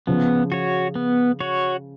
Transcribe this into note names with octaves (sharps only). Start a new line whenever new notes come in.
C#3 F3 B3
F#4 C#5
B3
F#4 C#5